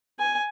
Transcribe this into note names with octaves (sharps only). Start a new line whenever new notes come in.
G#5